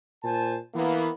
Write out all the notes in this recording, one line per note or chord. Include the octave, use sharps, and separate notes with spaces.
A#2 C5 G#5 A5
E3 A#3 B3